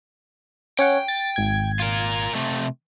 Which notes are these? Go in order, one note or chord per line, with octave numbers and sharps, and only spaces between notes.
C#4 C#5 F#5 G5
A6
G#1 G#6
F4 A#4
C3 A3